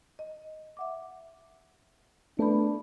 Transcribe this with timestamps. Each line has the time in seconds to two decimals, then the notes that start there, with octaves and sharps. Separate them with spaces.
0.19 D#5
0.77 E5 F#5 D6
2.39 A3 B3 D4 B4 B5